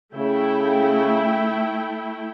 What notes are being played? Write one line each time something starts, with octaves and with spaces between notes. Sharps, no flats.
C#3 A3 E4 G5